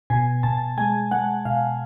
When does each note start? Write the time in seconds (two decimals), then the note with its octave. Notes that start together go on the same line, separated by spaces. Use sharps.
0.10 B2 G#5
0.43 B2 A5
0.77 G#3 G#5
1.11 G#3 F#5
1.45 B2 F5